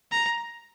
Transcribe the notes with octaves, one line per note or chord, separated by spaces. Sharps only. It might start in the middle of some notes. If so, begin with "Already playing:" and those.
A#5